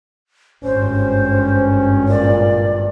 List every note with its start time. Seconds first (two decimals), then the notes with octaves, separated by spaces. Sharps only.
0.64 G#1 G2 C#4 C5
2.08 A#2 D5